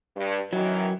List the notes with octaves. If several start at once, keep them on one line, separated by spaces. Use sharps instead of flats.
G2
F#2 D#3 E3 F#3